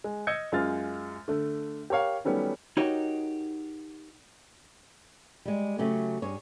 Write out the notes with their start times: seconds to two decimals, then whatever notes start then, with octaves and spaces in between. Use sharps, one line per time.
0.04 G#3
0.27 D#5 E6 G6 G#6 C#7
0.52 F#2 G#3 F4 F6 A6
1.28 D3 A3
1.90 G4 A#4 C#5 F5
2.25 D#3 F#3 G3 A3 B3 C#4
2.77 D#4 F#4 G4 A#4 C#5 D#5
5.45 G3 G#3
5.79 C#3 F#3 A3 C#4 G4
6.22 G2 G#4 C#5